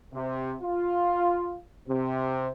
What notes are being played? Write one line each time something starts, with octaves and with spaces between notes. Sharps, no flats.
C3
F4
C3